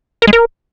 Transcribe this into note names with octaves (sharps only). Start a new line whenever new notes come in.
A#4
G#3
A#4